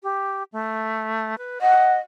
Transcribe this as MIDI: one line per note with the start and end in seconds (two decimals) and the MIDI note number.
0.03 0.43 67
0.52 1.38 57
1.38 1.59 71
1.61 2.00 75
1.61 1.94 78